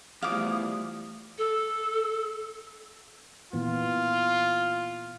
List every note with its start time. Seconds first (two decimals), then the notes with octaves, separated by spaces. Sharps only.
0.22 E2 F3 G3 A3 F5 D6 D#6
1.38 A4
3.53 A#2 E3 B3 F4